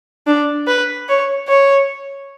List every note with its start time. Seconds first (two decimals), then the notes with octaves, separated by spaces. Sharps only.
0.27 D4
0.67 B4
1.08 C#5
1.48 C#5